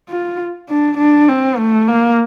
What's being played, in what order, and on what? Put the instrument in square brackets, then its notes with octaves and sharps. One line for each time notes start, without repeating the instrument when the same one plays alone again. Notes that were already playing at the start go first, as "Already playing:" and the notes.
[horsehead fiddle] F4
D4
D4
C4
A3
A#3